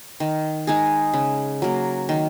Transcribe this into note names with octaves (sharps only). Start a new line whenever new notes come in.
D#3
G#3 D#4 G#4
C#3
F#3 A#3
D#3